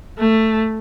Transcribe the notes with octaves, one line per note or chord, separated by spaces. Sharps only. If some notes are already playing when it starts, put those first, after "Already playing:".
A3